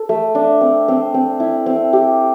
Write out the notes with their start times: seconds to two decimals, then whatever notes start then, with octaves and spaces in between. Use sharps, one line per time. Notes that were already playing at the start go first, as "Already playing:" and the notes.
Already playing: A4
0.09 A3
0.35 D4
0.61 C4
0.88 C4
1.14 C4
1.40 E4
1.66 C4
1.93 G4